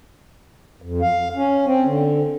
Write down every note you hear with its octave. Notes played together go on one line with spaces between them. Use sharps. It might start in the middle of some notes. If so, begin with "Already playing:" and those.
F2
F5
C#4
C4
D3